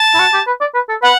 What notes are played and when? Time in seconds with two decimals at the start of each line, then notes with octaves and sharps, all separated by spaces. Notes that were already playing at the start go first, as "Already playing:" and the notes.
Already playing: A5
0.15 E4
0.20 F#4
0.34 G4
0.47 B4
0.61 D5
0.75 B4
0.89 A4
1.02 B4 F#5